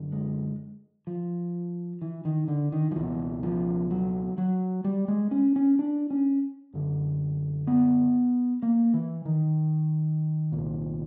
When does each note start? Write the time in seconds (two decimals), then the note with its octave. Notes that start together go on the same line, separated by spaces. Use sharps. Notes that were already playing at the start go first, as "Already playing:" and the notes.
Already playing: F#2 D3
0.12 G#3
1.07 F3
2.02 E3
2.25 D#3
2.48 D3
2.72 D#3
2.91 F3
2.95 C#2 B2 E3
3.43 F3
3.91 F#3
4.38 F#3
4.84 G3
5.08 G#3
5.31 C#4
5.56 C#4
5.79 D4
6.10 C#4
6.73 F#2 D3
7.67 B3
8.62 A#3
8.94 E3
9.25 D#3
10.52 C2 A#2